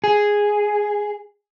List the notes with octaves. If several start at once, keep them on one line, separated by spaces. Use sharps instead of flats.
G#4